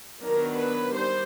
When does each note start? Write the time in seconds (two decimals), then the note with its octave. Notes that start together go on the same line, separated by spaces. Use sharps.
0.22 D#3 F#3 B3 D4 A#4
0.58 B4
0.95 G3 C5